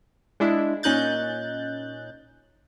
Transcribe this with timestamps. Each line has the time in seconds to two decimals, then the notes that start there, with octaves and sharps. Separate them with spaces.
0.40 G#3 D4 E4
0.83 A#2 C#4 D#4 F#6 G6 A6